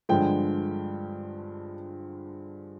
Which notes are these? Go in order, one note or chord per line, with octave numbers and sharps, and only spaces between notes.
G2 D3 F3 G#3 G5